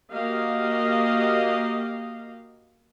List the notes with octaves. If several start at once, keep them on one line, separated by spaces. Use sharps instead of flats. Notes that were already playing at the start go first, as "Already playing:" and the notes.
A#3 F#4 G4 D#5 F5